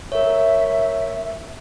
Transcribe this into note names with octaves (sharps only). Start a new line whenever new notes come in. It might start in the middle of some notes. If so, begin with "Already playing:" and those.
A#4 C#5 E5